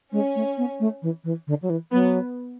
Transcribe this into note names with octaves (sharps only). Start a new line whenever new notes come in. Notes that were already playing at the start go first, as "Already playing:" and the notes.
G#3 C#4
A3
B3
A3
E3
E3
D3
F#3
E3
F#3 B3